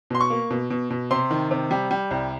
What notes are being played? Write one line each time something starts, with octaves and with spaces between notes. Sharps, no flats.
B2 C6
C#6
A#3
B2
B2
B2
C3 C6
D#3
C3
G3
G3
C2